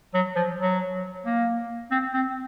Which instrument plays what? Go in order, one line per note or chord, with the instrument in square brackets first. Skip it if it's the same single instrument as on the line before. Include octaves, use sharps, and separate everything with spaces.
[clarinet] F#3
F3
F#3
A#3
C4
C4